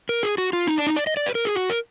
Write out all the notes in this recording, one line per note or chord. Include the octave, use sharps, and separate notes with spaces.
A#4
G#4
F#4
F4
D#4
D4
D#4
D5
D#5
D5
B4
A#4
G#4
F#4
A#4